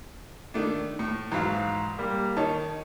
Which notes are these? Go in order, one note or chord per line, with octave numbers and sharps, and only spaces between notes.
D#3 A3 D4
A2
G#2 E3 F#3 F5
G3 A#3
D#3 C#5 D#5 A5